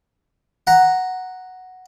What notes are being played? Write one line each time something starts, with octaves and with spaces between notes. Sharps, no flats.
F#5 A#5